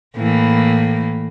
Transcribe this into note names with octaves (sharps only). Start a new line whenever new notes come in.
A2 E3 A#3